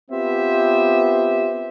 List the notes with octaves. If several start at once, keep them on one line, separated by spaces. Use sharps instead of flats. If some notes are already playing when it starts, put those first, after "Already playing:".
B3 C4 F4 G4 C5 E5